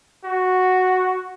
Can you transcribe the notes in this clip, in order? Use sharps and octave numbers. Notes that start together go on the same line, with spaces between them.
F#4